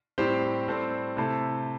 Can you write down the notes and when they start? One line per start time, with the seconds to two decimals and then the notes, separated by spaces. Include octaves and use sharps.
0.18 A2 G3 C4 G4 C5
0.68 A2 G3 C4 A4 C5
1.17 C3 A3 E4 A4 C5